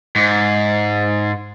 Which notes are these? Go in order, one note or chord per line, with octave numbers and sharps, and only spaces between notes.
G#2